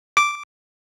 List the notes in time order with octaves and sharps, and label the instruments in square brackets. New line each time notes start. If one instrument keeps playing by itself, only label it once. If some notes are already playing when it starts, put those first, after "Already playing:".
[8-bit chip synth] D6